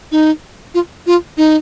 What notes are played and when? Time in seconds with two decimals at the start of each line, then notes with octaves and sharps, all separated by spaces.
0.12 D#4
0.74 F4
1.07 F4
1.37 D#4